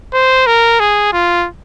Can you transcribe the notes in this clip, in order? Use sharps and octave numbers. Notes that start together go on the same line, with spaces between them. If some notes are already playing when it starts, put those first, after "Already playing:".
C5
A#4
G#4
F4